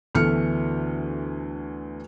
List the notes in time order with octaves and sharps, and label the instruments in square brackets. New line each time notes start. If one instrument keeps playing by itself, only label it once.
[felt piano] D2 E3 A3 B3 F6 C#7